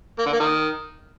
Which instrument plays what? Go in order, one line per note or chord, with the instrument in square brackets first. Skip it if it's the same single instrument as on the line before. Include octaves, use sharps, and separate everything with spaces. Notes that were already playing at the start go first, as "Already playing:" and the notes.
[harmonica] A#3
D3
A#3
D#3